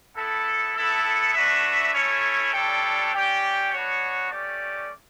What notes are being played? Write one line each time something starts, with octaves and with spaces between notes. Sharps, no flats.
B3 E4 A4
B3 E4 A4
A3 D4 F#4 B4 E5
A3 C#4 E4 A4 C#5
G3 D4 A4 C#5 G5
C#4 G4 D5 G5
B3 D4 F#4 C#5
A3 C#4 G4 D5